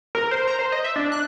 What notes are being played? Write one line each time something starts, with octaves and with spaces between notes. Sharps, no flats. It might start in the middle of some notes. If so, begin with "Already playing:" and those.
A#4
C5
A#5
C5
D#5
E5
D4
F#6